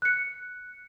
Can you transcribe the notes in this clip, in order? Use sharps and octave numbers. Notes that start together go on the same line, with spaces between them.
F#6 C#7